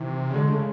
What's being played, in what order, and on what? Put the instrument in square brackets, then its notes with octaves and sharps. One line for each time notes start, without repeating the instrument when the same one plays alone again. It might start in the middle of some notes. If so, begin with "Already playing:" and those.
Already playing: [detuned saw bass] C3 [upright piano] D#3 E3
[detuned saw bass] C#3
[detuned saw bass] D3 [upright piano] G#3
[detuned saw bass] C#3 [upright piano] A3